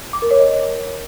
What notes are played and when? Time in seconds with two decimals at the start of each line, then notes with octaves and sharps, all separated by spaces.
0.13 D6
0.22 A#4
0.31 C#5
0.40 D#5